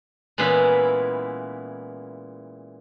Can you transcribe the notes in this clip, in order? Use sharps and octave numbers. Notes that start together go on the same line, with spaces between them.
A#2 E3 G#3 B3 C#4 E4